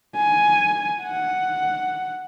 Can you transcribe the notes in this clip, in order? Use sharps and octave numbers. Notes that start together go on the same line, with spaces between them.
G#5
F#5